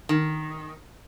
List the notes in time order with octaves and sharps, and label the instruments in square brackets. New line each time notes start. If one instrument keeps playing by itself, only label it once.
[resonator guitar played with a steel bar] D#3